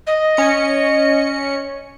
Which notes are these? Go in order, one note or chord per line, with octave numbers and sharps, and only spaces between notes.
D#5
C#4 C#7